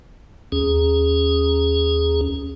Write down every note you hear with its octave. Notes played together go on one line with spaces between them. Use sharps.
D#2 C#4 G#4